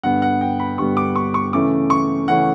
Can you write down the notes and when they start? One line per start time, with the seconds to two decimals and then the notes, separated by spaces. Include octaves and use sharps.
0.03 G2 D3 G3 B3 F#5
0.22 F#5
0.41 G5
0.60 B5
0.78 G2 D3 G3 B3 C#6
0.97 D6
1.16 C#6
1.34 C#6
1.53 C#3 E3 A3 C#4 D6
1.90 C#6
2.28 C#3 E3 A3 C#4 F#5